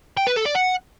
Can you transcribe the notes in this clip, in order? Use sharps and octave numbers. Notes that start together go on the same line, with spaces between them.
G5
B4
A4
D5
F#5